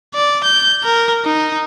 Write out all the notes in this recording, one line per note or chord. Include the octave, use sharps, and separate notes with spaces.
D5
G6
A#4
D#4